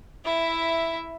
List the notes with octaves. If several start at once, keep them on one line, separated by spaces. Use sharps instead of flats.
E4 E5